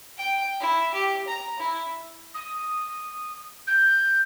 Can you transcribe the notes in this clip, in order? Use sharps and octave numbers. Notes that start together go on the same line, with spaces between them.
G5
E4
G4
A#5
E4
D#6
G6